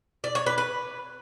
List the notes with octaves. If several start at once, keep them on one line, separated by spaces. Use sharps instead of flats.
D5
C#5
B4
B4